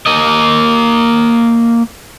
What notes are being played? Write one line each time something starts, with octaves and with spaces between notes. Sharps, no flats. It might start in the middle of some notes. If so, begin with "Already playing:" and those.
A#3 D#5